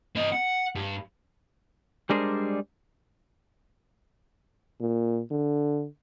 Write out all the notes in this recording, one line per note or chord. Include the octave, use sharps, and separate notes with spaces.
C4 D#5
F#5
G2
G3 G#3 D4 G#4 A#4 C5
A#2
D3